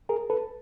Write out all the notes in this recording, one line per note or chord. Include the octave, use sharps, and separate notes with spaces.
G#4 A#4
A4 B4